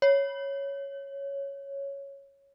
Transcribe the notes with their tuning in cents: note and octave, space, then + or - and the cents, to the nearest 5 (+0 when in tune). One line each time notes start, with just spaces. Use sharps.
C#5 +0